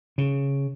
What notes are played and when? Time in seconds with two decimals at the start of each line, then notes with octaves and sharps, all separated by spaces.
0.18 C#3